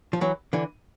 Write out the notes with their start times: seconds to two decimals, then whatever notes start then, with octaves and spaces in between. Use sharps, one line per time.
0.13 F3
0.21 E3 F#3
0.53 D3 E3